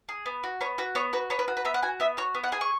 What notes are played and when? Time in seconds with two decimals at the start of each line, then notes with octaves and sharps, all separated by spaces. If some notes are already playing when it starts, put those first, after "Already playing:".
0.09 G#4
0.26 B3
0.44 F#4
0.61 B3 C#5
0.78 F#4 B4
0.95 B3 C#5
1.13 F#4 B4
1.30 B3 C#5
1.39 B4
1.48 F#4
1.57 B4
1.65 B3 E5
1.74 F#5
1.83 F#4 G#5
2.00 B3 E5
2.17 F#4 C#5
2.35 B3
2.44 F#5
2.52 G#4 G#5
2.61 C#6